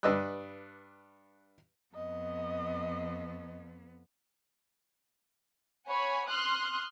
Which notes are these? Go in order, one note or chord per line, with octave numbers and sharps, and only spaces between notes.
G2 D4 B4 D#5 E6 F#6
F2 B3 D#5
C#5 F#5 G#5 B5
C6 D#6 F6 F#6